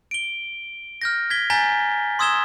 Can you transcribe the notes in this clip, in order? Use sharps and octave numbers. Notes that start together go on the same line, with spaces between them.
D7 G7
F6 G6 A#6
G#6 B6 G7
G#5 A#5 G6 A6 B6 G7
C6 D#6 E6 G#6 E7 G7